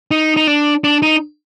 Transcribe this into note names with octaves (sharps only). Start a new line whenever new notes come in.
D#4
D#4
D4
D4
D#4